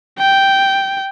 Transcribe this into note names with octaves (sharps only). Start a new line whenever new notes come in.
G5